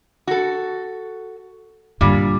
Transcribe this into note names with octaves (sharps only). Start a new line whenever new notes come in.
F#4 A4
G2 A#2 D3 G3